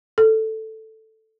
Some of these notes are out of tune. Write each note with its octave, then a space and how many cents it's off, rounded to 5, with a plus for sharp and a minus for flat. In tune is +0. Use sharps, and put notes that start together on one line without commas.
A4 +5